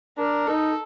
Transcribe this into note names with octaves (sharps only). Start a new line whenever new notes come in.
D4 A#4
D#4 A4